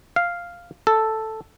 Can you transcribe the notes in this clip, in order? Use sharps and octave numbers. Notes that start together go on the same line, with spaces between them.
F5
A4